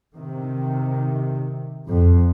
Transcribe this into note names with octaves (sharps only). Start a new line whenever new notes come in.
C3 D#3
F2